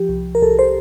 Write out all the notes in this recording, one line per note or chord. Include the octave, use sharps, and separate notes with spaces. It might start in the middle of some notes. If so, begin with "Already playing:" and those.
Already playing: F3 G4
C2
A#4
C2 A4
C5